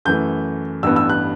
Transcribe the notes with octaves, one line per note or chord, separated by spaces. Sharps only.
F#2 E3 A3 G6
A1 G2 E3 B3 E6
E6
F#6